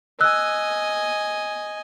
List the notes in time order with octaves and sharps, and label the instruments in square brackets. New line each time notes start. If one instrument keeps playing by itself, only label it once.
[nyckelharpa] D#5 G#5 [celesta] E6 F#6